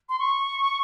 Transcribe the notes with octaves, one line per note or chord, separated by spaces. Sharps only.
C6
C#6